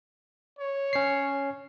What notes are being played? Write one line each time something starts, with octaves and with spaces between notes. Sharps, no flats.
C#5
C#4 C7